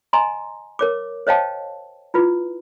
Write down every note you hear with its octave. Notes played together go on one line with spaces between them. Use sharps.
D#5 G#5 A#5 C6
A#4 C#5 D6
C5 C#5 D#5 F5 G5 A5
E4 F4 B4